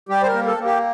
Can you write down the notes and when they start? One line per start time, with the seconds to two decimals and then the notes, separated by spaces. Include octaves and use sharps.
0.09 G3 G4
0.23 C5
0.27 A#4
0.33 A#3
0.46 A4
0.58 A#3
0.65 G4